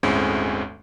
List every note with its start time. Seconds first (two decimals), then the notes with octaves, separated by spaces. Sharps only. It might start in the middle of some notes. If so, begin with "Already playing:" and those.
0.03 G1 D2 A2 G#3 C4 C#4